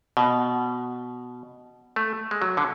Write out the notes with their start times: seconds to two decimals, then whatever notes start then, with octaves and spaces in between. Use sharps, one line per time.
0.17 B2
1.96 A3
2.31 G#3
2.42 F#3
2.57 D3